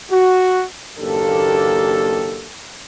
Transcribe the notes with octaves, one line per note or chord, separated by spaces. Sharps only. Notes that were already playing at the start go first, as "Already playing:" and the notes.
F#4
F#1 D#2 A#3 D4 G4 A4